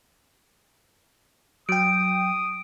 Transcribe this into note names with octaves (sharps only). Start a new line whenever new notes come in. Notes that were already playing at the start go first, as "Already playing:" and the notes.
F#3 G5 D#6 D7